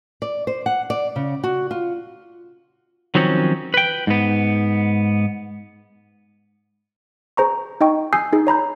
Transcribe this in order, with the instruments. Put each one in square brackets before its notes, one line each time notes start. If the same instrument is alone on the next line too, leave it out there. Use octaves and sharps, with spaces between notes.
[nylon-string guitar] D5
C5
F#5
D5
C#3
F#4
F4
[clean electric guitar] D#3 F3 F#3 C4 C#4
B4 G5
G#2 B3
[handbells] G#4 C5 A#5 C#6
D#4 D#5 G5 C#6
G#5 D#6 E6 G6 C7
D#4 G#4
C#5 A#5 B5 G6